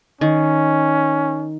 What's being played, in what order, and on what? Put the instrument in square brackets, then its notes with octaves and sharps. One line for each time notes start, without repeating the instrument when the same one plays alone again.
[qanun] D#3 [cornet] C#4